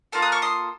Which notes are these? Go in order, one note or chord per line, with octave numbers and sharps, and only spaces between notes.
A#3 F4 A4 F6
D#6 F#6
C#6 F6
C6 D#6